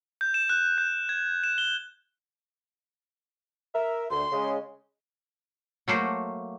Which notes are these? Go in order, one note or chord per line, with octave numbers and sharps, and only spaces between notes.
G6
E7
F#6
G6
G#6
E7
G7
A#4 E5
D2 C6
C#3 G#3
F#3 A3 A#3 C5